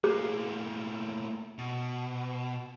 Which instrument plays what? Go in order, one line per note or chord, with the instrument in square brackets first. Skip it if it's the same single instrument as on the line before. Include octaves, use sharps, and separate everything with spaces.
[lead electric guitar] A2 A#3 [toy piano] G#4
[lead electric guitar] B2